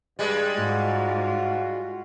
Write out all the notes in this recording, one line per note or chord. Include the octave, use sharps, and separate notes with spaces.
G2 G3 G#3
G#2 F4 F#4